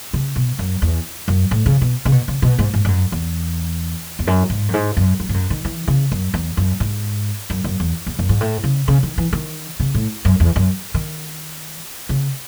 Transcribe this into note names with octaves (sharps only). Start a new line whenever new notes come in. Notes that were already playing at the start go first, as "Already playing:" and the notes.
C#3
B2
F#2
E2
F#2
A2
C#3
B2
C#3
B2
C#3
B2
G#2
G#2
G#2
F#2
E2
E2
F#2
G#2
F#2
G#2
F#2
F#2
G#2
F#2
D#3
E3
C#3
F#2
E2
F#2
G#2
F#2
F#2
E2
E2
F#2
G#2
A2
C#3
C#3
D#3
E3
D#3
C#3
A2
F#2
E2
F#2
D#3
C#3